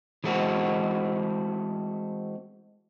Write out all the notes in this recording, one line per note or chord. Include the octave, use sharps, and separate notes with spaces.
E3 G#3 A3 C4 F#4